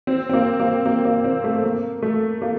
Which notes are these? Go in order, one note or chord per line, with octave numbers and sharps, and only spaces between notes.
C4
C4
A#3
A#3
A#3
A#3
C4
A3
A#3
A3
A#3